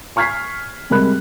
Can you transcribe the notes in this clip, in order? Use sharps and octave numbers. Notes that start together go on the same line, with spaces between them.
G#5 C#6 F6 G#6 B6 C7
C3 G3 G#3 A#4 B5 F#6